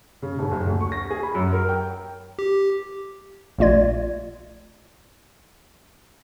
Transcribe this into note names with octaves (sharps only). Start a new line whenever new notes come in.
C#3
D#1
F#1
D2
C#6
A#6
G#4
B5
F#2
A#4
G5
G4
A#1 A#2 A3 F4 D5 G#6